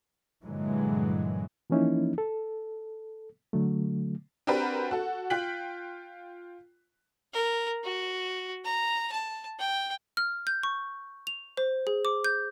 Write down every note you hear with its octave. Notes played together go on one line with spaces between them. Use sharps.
G2 A#2 D3 E3 F#3 G#3
E3 F3 A#3 C#4 D#4 E4
A4
D3 F#3 A3
C4 D4 F#4 G4 A#4 B4
F#4 A4
F4 G5 F#6 B6 F#7
A#4
F#4
A#5
A5
G5
F6
G6
C#6
F7
C5
G#4
D6
G6